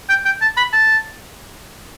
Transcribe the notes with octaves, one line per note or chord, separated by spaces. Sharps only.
G5
G5
A5
B5
A5